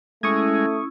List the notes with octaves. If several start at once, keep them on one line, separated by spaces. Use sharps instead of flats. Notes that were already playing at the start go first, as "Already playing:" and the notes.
G#3 A3 C#4 E4 C#6 D#6 E6 G#6